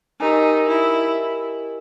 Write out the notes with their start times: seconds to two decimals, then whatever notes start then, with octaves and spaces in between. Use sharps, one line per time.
0.20 D#4 G4 A#4 D#5 G#5
0.68 E4